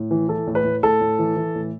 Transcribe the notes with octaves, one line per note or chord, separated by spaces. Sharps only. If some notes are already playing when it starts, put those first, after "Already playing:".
Already playing: A2
E3
E3 A4
A2
B4
A2
A2 A4
A2
E3
E3
A2